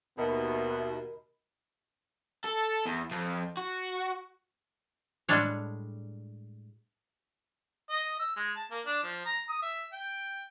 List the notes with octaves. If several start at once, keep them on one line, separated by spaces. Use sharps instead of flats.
D#2 B2 B3 A#4 D#5 E5 B5
A4
E2
F2
F#4
A2 G3 G#3 D4 C#5
D#5
E6
G#3
A5
A#3
D4
F3
A#5
D#6
E5
G5